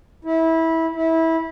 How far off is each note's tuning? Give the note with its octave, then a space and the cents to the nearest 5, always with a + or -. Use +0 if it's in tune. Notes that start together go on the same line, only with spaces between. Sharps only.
E4 -20
E4 -20